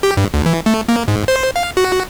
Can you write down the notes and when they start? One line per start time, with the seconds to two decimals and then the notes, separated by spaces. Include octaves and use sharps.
0.03 G4
0.17 G2
0.34 D2
0.46 E3
0.66 A3
0.88 A#3
1.08 G#2
1.28 C5
1.56 F5
1.77 F#4